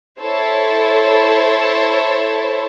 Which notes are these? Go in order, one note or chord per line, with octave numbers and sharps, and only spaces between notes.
E4 A4 C5 C#5